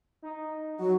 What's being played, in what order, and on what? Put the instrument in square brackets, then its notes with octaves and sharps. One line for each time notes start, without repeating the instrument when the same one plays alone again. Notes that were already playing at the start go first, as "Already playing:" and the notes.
[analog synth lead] D#4
[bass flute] F#3 [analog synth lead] F#4